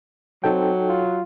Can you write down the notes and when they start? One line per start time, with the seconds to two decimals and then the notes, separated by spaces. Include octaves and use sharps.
0.44 F#3 C4 D#4 A4 G5
0.88 F4